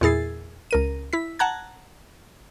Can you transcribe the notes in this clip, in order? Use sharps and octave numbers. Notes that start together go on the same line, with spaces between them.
E2 A#2 E4 G#4 A6 C7
C#2 A#4 D#7
E4 B6
F#5 A5 A#5 F#6 G#6